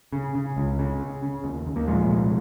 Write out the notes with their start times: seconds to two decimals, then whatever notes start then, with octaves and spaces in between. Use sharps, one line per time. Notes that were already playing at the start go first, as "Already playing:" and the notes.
0.13 C#3
0.35 C#3
0.57 C#2
0.79 C#3
1.00 C#3
1.23 C#3
1.44 D#2
1.66 D#2
1.76 A#3
1.88 A#2 F3 G#3
2.10 C2